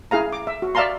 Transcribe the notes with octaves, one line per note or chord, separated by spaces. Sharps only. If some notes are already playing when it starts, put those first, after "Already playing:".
E4 G#4 F5 A#5
D6
E5
F#4
D5 E5 F5 A5 A#5 C6